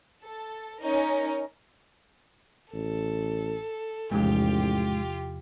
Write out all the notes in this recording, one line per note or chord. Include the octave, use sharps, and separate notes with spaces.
A4
C#4 D#4 A#4
A1 A4
A1 E2 G#2 C3 F3 G#3 F4 G4